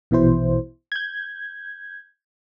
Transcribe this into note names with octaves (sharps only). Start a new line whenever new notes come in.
A#1 B2 E3 E4 C5
G6 G#6